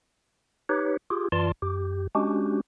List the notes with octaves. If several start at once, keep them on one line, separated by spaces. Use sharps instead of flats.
D#4 G4 B4 C#5
F4 G4 G#4
F#2 E3 F4 D5 A5 C6
F#2 G4
G#3 C#4 D4 F#4 G4